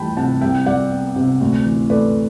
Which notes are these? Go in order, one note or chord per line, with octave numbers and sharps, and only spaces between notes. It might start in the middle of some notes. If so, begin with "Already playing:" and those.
Already playing: D2 E3 G3 G5 A5 B5
C3 F#5 A5
C2 E5 G5
G3 D5 F#5
B3
C3
D2
E3
A3 B4 D5